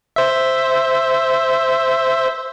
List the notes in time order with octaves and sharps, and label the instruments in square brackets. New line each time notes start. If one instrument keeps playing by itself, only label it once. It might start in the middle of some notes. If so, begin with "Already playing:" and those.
[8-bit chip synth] C5 E5